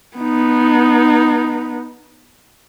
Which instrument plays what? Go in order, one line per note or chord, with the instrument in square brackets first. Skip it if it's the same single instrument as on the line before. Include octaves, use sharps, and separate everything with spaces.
[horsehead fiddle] B3 D#4